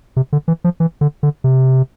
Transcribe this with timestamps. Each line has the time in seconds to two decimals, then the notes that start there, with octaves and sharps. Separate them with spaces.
0.16 C3
0.33 D3
0.48 E3
0.64 F3
0.80 E3
1.01 D3
1.23 D3
1.44 C3